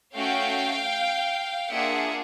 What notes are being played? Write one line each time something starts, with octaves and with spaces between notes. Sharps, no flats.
A3 C#4 F#4 F5 G5
A#3 D4 F4 G#4 E5 F#5